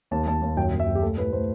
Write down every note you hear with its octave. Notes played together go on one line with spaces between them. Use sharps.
D#2 A5
D#2 A5
D#2
F#2 G5
F#2
E5
F#2
G4
A3 A4
A2 B4
A3 C5